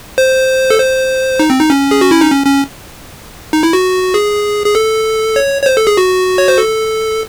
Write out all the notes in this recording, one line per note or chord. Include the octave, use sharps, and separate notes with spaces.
C5
A4
C5
D#4
C4
D#4
C#4
G#4
F#4
E4
D#4
C#4
C#4
D#4
E4
F#4
G#4
G#4
A4
C#5
C#5
C5
A4
G#4
F#4
C#5
C5
A4